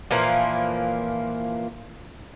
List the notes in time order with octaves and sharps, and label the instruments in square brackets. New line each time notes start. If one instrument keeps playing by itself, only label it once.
[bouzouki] A#2 E3 F3 A#3